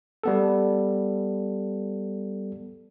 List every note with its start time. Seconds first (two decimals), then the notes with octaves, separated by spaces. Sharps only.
0.24 G3 B3 A4